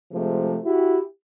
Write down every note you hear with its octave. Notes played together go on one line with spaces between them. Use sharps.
C3 F3 G#3 A3
E4 F#4 G4